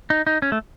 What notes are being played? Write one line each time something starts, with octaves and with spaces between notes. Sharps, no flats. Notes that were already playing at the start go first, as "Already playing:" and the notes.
D#4
D#4
C#4
A3